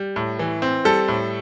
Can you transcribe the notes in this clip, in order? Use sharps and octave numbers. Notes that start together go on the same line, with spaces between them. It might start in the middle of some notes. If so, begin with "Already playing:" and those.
Already playing: G3
A2
E3
C4
G3 A4
A2